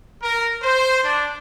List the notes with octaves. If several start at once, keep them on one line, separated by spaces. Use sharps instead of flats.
A#4
C5
D4